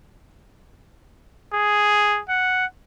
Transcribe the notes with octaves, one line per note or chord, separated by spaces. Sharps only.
G#4
F#5